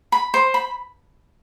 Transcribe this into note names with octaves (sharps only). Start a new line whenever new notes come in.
B5
C5
B5